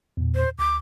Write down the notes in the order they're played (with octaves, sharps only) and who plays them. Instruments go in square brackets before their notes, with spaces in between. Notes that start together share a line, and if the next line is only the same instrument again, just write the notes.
[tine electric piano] E2 A#2
[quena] C5
[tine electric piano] D2 [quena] D6